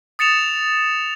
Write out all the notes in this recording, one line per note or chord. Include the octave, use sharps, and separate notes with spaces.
D#6 A6 C#7 E7 F7